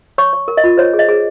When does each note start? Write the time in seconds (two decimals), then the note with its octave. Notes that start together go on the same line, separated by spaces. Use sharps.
0.18 C#5 C#6
0.33 C#5
0.48 A#4
0.57 D#5
0.64 F4
0.78 C5 C#5
0.93 G#4
0.99 D#5
1.09 G#4